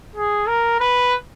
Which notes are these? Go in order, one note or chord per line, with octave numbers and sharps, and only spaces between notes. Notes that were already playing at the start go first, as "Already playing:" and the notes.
G#4
A#4
B4